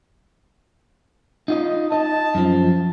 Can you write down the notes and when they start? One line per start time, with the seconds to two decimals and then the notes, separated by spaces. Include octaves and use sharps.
1.48 D#4 F4 D#5
1.92 D#4 D#5 A5
2.35 F#2 F3